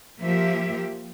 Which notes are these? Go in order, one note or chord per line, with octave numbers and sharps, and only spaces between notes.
F3 A#3 G4 E5